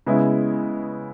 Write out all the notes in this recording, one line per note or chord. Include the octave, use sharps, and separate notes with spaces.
C#3 G#3 B3 E4